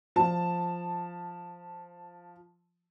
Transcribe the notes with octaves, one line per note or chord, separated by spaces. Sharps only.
F3 A5